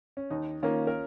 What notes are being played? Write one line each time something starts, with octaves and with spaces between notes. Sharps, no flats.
C#4
D#2 D#4
D#3 A#3 C#4 F4
A#4